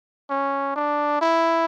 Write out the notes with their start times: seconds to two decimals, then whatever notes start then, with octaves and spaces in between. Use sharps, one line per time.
0.30 C#4
0.76 D4
1.22 E4